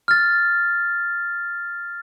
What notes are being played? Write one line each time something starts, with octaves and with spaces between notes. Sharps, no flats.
F6 A6